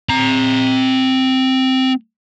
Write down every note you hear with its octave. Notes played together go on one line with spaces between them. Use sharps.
C4 A#5